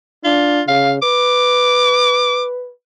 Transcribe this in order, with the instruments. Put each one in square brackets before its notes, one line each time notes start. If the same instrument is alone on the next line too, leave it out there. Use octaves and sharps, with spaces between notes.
[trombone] D4 [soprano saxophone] F4
[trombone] C#3 [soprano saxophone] F5
[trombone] B4 [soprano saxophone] D6